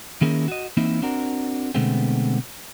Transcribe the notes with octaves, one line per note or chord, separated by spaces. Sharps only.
D#3 A#3 C#4 E4 G#4 A#4
F#4 D#5
E3 A#3 C4 D#4 E4
C4 D4 F#4 A#4
B2 D3 G#3 A3 B3 C4